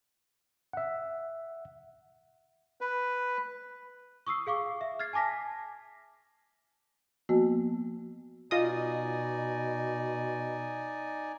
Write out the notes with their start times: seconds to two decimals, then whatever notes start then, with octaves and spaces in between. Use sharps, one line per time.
0.73 E5 F#5
2.81 B4
4.27 C#6 D#6 E6 C7
4.47 G#4 F5 C#6 D6
4.81 E5
4.99 F6 G#6 A6 C7
5.13 G#5 A5 D6 A#6 B6
7.29 F3 A#3 B3 F#4
8.51 B2 D#4 F4 D5 D#5 G#5 D#6